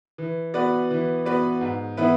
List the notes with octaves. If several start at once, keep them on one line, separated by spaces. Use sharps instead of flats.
E3
B3 F#4 B4 D5
E3
B3 F#4 B4 D5
G#2
E3 B3 E4 B4